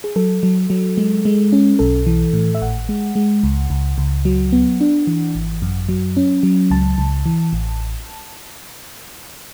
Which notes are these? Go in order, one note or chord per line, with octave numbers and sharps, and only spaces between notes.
G#4
F#3 A4
F#3
F#3
G#3
G#3
C#4
B1 A4
E3
A2
E5
G#1 F#5
G#3
G#3
C#2
C#2
C#2
F#3
B3
D4
E3
G#1
F#2
F#3
C#4
F#3
C#2 A5
C#2
E3
A1